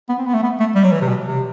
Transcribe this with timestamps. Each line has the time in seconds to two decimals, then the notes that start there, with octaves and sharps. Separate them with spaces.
0.09 B3
0.18 C4
0.26 B3
0.34 A3
0.43 B3
0.60 A3
0.75 G3
0.84 F#3
0.92 E3
1.01 C3
1.09 B2
1.26 C3